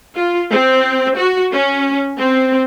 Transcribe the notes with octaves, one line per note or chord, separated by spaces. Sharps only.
F4
C4
F#4
C#4
C4